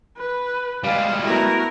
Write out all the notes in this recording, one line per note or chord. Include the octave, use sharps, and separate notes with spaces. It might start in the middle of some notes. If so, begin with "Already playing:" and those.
B4
G3 G#3 F5
A3 B3 E4 F#4 A#4